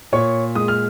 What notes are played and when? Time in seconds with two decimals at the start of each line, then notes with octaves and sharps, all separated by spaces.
0.12 A#2 C#5 C#6
0.55 G#3 D#6
0.68 F6